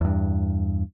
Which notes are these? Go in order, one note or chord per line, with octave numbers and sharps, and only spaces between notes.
E2 G2